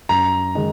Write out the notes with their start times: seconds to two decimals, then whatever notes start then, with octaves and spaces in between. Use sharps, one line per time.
0.09 F#2 A#5
0.55 D#3 G#3 D#4